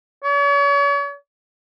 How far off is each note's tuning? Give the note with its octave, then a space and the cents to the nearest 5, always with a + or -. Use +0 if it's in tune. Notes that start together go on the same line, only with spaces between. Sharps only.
C#5 +40